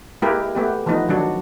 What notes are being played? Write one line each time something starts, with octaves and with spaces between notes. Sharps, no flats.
G#3 A#3 E4 G4 A#4 B4
A3 B3 G4
E3 F3 A3 B3 D#4
D#3 F#3 D4 F#4